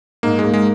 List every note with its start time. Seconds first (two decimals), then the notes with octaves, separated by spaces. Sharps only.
0.23 G#2 A#3
0.39 G#3 A#3
0.53 G#3